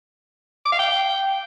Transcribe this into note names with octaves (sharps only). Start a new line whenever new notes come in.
D6
F5
G5